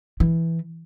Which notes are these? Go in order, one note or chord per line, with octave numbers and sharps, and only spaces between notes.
E3